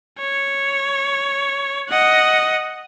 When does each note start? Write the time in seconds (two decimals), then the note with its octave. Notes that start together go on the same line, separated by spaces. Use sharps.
0.19 C#5
1.89 D#5 F#5